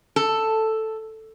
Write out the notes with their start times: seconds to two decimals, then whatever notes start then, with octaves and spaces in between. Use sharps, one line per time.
0.16 A4